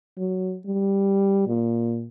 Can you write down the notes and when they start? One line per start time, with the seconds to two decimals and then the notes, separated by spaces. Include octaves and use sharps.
0.18 F#3
0.66 G3
1.47 A#2